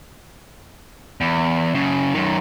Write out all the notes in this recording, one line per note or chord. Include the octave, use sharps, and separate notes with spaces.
E2
F#2 C#3
F#2 D#3